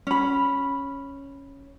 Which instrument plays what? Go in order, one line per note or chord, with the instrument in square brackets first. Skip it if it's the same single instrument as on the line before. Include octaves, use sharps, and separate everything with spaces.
[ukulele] C#4 B5